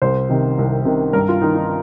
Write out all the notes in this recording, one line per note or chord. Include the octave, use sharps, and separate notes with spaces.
C2 C5
C3 D#3
C2
C3 D#3
G2 A#4
F4
D#3 D#4
D#4